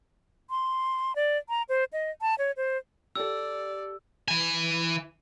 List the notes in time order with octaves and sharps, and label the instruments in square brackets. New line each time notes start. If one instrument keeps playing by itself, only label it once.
[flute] C6
D5
A#5
C5
D#5
A5
C#5
C5
[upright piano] G4 A4 [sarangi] D5 [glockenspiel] E6
[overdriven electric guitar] E3 G#5